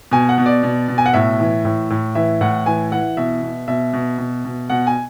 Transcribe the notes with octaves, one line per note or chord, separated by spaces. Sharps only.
B2 G#5
F#5
B2
D5
B2
B2
G#5
F#5
A2 E5
E3
A2
A2
E3 E5
A2 F#5
E3 G#5
E3 F#5
B2 E5
B2
B2 E5
B2
B2
B2
B2 F#5
G#5